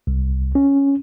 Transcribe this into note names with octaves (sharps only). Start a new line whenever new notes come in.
C2
C#4